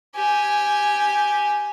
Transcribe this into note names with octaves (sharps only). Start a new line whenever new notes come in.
G4 G#5